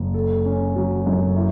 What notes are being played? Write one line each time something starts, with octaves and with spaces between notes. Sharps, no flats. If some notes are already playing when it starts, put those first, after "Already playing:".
Already playing: F#1
A4
C#4
F#3
F#2
E4